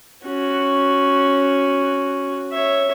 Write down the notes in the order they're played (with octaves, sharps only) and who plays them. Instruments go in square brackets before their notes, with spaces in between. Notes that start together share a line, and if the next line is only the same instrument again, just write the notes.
[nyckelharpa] C#4 F#4
C#5 E5